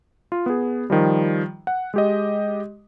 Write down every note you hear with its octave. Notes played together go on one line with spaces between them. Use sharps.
F4
B3 G#4
D#3 F3 G3
F#5
G#3 G4 D#5